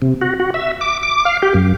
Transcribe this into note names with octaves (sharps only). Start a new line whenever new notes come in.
C3
F#4
F#4
E5
D6
D6
F5
G4
F#2